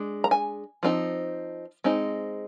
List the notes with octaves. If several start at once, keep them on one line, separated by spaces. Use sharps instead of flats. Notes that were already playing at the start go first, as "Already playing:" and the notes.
Already playing: G#3 D4
A#5
G#5
F3 C4 D#4
G#3 C4 D#4